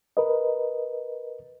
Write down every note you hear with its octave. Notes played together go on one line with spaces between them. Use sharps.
A#4 B4 D#5